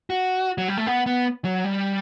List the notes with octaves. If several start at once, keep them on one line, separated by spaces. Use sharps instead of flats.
F#4
F#3
G3
A3
B3
B3
F#3
G3